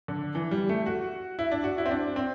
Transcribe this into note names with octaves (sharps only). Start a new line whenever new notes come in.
D3
E3
G3
A3
F#4
E4
D4
F#4
E4
C4
D4
C4